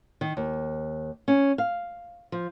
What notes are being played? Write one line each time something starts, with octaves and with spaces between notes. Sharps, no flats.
D#3
D#2
C#4
F5
F3